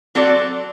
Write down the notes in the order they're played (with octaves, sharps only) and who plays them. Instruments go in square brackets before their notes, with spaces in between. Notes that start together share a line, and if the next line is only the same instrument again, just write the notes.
[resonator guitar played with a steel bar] F#3 C4 F#4 A4 D5